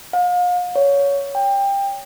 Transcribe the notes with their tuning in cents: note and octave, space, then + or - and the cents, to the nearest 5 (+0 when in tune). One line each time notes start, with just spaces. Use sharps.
F5 +40
C#5 +15
G5 +20